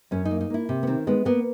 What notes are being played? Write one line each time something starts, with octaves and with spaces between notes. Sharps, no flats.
F#2 C#4
D#4
A#3
D#4
A#3 E4
C3
B3
D#3 C4
G#3 B3
A#3 B3